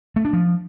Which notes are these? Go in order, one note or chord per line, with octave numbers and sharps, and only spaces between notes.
A3
D4
F3